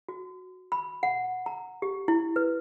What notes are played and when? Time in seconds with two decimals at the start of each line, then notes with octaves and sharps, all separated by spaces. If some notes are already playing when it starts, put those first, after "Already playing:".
0.09 F#4
0.72 B5
1.03 F#5
1.46 A#5
1.82 G4
2.08 E4
2.36 B4